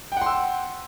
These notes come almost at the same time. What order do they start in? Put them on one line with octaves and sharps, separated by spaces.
G5 F#5 C6 E6